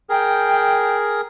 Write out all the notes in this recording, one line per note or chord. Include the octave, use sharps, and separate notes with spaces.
G#4 A#4 G5